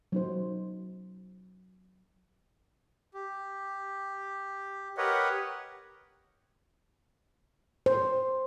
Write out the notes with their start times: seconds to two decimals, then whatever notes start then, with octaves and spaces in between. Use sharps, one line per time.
0.12 F#3 D#4 C5
3.14 G4
4.97 G4 A#4 B4 C#5 D#5 F#5
7.86 C5